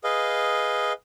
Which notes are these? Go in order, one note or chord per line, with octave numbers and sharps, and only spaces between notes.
G#4 B4 D#5 F5